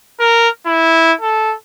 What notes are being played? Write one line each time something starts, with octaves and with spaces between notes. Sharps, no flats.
A#4
E4
A4